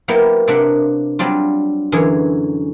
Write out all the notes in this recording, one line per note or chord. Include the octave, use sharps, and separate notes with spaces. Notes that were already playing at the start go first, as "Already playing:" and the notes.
F#3 A#3 B3 E4 G4
C3 A#3 D4 E5 F#5
F#3 G3 C4 D4 F4
F#2 D3 E3 C#4 G#4